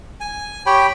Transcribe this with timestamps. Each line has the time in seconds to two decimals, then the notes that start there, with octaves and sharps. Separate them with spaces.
0.20 G#5
0.66 G4 C#5 G5 B5